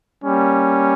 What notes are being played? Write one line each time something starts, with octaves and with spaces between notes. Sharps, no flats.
G3 A#3 C#4